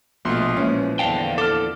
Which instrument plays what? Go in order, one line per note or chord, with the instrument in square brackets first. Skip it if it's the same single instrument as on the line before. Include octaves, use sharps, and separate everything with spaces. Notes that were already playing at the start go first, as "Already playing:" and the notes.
[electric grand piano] A#1 C6 [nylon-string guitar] B2 D#5 [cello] A3 F4
[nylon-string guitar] A#2 E3 F3 [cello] G#3 [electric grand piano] C#4
[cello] E2 D3 [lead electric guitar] F5 G5 [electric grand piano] A5
[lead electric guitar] A4 [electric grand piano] D6 F6